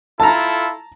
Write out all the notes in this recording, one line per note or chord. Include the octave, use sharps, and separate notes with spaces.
E4 F4 A4 A5 A#5